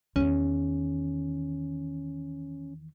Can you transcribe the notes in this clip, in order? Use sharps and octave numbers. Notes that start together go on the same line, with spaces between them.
E2 D#3 C#4